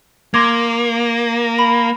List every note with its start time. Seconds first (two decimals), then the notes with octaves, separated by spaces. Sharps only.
0.34 A#3 C6 D6 G#6
1.59 B5